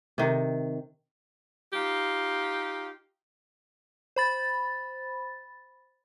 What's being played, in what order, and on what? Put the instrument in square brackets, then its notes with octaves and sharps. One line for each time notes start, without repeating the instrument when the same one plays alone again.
[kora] C3 D#3
[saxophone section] D#4 F4 G4
[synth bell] C5 B5 A6